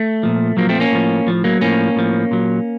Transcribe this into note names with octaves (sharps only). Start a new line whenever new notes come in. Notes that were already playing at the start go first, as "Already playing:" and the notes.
Already playing: A3
A#2 F3
A#2 F3 F#3 A#3
A3 C4
A#3 C#4
A2 F3
A2 F3
F#3 A#3
A2 F3 A#3 C#4
A2 F3
A#2 F#3